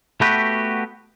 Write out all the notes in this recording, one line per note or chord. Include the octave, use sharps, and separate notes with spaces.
A3 B3 F#4 G4 B4